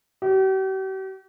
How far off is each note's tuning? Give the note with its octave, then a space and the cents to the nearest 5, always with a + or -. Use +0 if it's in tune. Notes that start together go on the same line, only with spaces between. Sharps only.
G4 -45